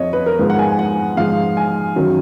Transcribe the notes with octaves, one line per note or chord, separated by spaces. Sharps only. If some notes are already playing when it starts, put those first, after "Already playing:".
Already playing: F2 F3 C#5 D#5
B4
A#4
G#2 F3 B4
F#5
G#5
G#5
F#5
G#2 F3 F5
G#5
F#2 D#3 F#3